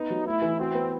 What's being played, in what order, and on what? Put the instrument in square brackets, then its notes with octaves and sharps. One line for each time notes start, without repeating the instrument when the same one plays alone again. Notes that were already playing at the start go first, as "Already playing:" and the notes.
Already playing: [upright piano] B3 [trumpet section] D#4
[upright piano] F#3
[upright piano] A3 [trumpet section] E4
[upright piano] E3
[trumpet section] C4 [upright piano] F#4
[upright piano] B3